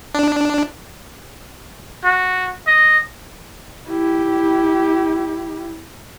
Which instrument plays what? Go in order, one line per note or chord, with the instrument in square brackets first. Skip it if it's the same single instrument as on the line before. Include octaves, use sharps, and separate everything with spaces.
[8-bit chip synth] D4
[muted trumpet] F#4
D#5
[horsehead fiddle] E4 G4